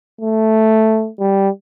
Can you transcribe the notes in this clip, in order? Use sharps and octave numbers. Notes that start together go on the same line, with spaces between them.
A3
G3